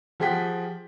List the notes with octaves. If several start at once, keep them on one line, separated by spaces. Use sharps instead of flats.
F3 G4 G#4 F#5 G5 B6